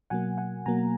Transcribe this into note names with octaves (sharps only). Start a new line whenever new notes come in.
B2 F#3 A#3 F#5 G#5
F#5 G#5
B2 F#3 A#3 G#5 A#5